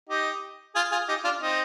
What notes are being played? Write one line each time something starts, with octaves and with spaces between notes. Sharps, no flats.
D#4 G4
F4 G#4
F4 G#4
D#4 G4
D4 F4
C4 D#4